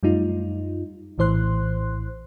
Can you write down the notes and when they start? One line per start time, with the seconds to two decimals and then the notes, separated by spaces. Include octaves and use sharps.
0.03 F#2 G3 A3 D#4 F4
1.18 A#1 A2 E3 C5 C6 F#6